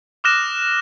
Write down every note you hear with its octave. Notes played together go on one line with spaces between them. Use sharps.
D6 D#6 F6 F#6 A#6 E7